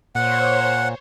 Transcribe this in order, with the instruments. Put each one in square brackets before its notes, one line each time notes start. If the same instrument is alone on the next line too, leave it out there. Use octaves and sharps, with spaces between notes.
[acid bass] A#2 [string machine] C5 C#5 [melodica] F#5